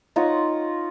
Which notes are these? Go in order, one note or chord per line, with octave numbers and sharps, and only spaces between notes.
D#4 F4 C#5 F#5